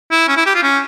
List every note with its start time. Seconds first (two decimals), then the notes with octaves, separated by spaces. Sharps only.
0.11 E4
0.28 C#4
0.37 E4
0.46 G4
0.55 F4
0.63 C#4